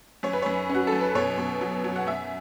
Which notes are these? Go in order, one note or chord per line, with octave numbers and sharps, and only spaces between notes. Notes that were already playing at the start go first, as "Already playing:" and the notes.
F#2 C#5
B4
F#2 C#5
C#4
F#4
A4
F#2
B4
B2 C#5
B2
F#3
F#3
F#5
F#2 E5